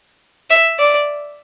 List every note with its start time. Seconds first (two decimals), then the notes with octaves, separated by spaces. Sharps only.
0.50 E5
0.79 D5